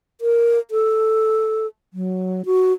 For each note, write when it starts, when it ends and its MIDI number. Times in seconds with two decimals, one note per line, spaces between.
0.21 0.59 70
0.71 1.67 69
1.94 2.42 54
2.45 2.73 66